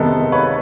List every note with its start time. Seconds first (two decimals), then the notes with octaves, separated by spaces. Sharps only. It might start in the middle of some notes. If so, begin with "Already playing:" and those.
Already playing: C3 D#3 G#3 B3 A4 B4
0.32 B4 C#5